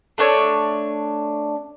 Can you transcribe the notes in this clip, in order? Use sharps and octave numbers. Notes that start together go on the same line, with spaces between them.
A3 D4 C#5